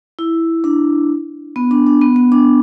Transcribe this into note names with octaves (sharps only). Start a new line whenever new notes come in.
E4
D4
B3
D4
D4
B3
B3
D4